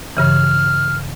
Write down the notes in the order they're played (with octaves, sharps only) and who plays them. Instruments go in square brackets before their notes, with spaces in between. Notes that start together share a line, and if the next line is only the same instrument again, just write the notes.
[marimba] G2 C#3 E3 [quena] F6